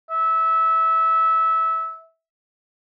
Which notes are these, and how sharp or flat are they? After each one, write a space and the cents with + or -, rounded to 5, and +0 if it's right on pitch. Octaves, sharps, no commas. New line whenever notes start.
E5 -20